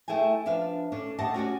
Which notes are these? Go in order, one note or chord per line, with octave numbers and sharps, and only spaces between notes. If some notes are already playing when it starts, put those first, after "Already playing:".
A3 E4 G#4 G5 G#5
F3 D4 B4 E5 F5
C#4 D4 A4
A3 G4 D#5 F#5 A5
C#4 F#4 D5 G#5